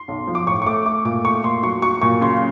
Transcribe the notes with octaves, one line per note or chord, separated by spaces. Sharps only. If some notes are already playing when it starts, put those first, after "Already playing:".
Already playing: C6
B1
F3
D6
A2 C#6
C#6
A3 D6
A3 D6
A#2 D6
A3 C#6
A#2 C6
F#3 C#6
F#3 C#6
A#2 C#6
C#3 C6